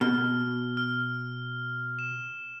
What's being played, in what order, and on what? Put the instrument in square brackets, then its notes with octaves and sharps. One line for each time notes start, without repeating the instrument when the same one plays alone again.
[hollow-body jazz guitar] B2 [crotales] F6
[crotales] F6
E7